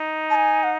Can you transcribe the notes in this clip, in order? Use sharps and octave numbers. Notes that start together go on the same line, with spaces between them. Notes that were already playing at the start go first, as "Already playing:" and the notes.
Already playing: D#4
A5
G#5
F#5